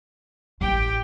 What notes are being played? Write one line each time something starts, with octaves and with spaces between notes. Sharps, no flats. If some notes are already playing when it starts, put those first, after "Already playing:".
A1 G4 G5